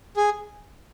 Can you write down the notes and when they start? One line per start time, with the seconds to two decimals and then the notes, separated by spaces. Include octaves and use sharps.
0.17 G#4